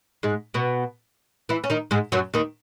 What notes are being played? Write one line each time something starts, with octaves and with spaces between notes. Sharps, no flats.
G#2 G#3
B2 B3
E3 E4
C#4
D#3 D#4
G#2 G#3
F#2 F#3
D#2 D#3